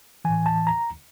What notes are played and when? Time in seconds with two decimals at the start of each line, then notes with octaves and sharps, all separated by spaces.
0.25 A2 E3 G#5
0.46 A5
0.67 A#5